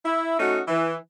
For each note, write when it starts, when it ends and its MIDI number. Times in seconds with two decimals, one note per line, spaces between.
0.05 0.39 64
0.39 0.61 57
0.39 0.61 61
0.39 0.61 63
0.39 0.61 66
0.68 0.96 52